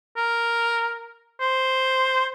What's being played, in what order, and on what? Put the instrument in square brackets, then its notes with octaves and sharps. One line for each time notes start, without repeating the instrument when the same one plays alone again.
[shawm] A#4
C5